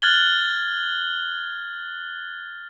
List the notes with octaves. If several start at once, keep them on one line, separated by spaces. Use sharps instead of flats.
F6 F#6 G#6 A6 F#7 G7